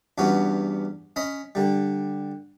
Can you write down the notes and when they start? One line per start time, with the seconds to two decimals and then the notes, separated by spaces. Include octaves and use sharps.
0.18 E2 G2 B3 C#4 F#4
1.16 C#4 D#5 B5
1.55 D3 G3